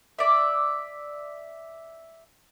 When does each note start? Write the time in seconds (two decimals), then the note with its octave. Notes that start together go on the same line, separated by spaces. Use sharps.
0.19 D5 E5